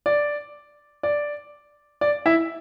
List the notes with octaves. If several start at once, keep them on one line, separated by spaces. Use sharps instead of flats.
D5
D5
D5
E4 E5